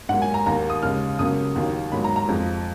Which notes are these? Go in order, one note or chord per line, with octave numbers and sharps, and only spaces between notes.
G#2 F#3 A#3 F#5
G#5
A#5
D#2 D#3 A#3 A#5
D#6
D#2 C#3 G#3 F6
C#2 C#3 F#3 A#3 D#6
D#2 D#3 F#3 A#3
G#2 D#3 F#3 A#3 B5
A#5
A#5
F2 F3 G#3